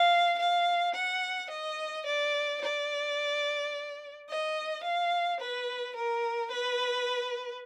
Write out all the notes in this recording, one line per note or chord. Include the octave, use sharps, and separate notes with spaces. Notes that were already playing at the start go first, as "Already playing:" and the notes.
Already playing: F5
F5
F#5
D#5
D5
D5
D#5
F5
B4
A#4
B4